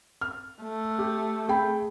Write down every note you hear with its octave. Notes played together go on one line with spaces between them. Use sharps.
F6
A3
G4
G#4 G5 B5